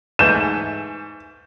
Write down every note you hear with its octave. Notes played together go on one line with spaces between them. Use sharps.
G#2 E3 A3 G6 E7